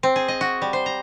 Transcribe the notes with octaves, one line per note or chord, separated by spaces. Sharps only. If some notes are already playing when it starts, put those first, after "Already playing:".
C4
G#4
D#5
F#4
G3
C5
A#5